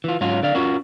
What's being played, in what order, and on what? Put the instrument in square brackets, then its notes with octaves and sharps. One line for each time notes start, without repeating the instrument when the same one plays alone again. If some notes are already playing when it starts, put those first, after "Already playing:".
[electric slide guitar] E3 F4
G#2 F#3 C#4 F4
D3 D5 F5
C#4 F4 F#4 A#4